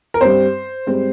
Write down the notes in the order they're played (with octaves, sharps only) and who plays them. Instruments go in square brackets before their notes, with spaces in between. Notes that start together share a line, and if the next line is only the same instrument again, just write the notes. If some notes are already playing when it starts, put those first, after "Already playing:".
[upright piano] A#4
G2 G3 C4 C5
G#2 G3 C4